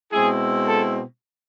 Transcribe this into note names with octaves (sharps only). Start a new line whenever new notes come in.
B2 G#3 C4 E4 G#4
A4